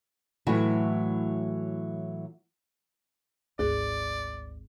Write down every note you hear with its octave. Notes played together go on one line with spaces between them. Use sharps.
A2 E3 F#3 A3 E4 F#4
G#1 D2 G#4 D5